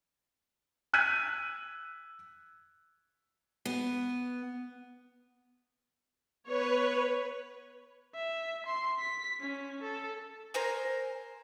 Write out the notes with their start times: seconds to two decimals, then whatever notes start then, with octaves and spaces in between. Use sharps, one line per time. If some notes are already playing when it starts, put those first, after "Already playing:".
0.93 E6 F#6 G#6 B6 D#7
3.65 B3
6.47 B3 B4 C#5
8.14 E5
8.66 C6
8.98 B6
9.40 C#4
9.82 A4
10.54 A#4 C5 G#5